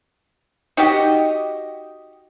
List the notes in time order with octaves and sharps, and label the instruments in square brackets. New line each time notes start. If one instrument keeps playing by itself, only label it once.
[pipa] D#4 F#4 G4 D#5